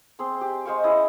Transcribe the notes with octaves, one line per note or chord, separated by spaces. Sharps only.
C4 G#4 C6
G4
G#3 C5 F5 C#6
C#4 E4 G#4 D#5